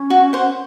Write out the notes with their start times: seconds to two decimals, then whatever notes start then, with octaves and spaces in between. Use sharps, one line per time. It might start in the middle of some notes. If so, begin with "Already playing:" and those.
Already playing: C#4
0.10 F#4
0.33 C5 F#5